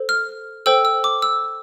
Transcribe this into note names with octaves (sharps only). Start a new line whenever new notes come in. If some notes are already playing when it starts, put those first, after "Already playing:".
Already playing: A4 C5
F6
A4 C5 G5 E6
E6
D6
E6